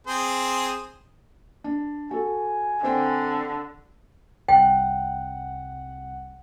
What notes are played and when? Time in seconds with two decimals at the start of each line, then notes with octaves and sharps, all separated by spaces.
0.07 C4 G#4 C5
1.64 D4
2.11 F#4 A4 G#5
2.83 D3 C4 C5 G5
4.49 C2 F#5 G5